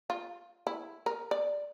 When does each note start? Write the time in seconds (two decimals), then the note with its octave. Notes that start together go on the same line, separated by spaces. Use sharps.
0.10 F4
0.67 E4
1.06 A#4
1.31 D5